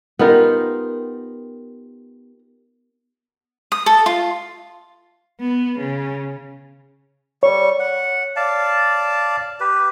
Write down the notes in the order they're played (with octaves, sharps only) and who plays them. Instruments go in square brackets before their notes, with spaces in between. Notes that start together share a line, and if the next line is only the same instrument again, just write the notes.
[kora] B3 D#4 F4 [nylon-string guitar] G4 A#4
[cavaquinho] D#6
A4
F4
[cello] B3
C#3
[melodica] G3 C#6 [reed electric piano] C#5
[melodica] F#5
D5 F5 A5
G4 B4